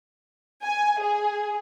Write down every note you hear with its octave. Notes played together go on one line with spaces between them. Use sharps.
G#5
G#4